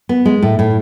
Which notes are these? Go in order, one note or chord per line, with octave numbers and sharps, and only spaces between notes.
B3
G#3
A2
A2